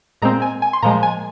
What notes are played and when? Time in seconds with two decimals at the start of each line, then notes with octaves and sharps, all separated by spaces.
0.22 A#2 G#3 C4 A#5
0.42 G#5
0.62 G#5
0.73 C6
0.82 A#2 F3 G#3 A#5
1.03 G#5